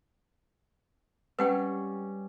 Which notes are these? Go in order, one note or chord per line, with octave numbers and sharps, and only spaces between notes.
G3 C#4 B4 F#5 G5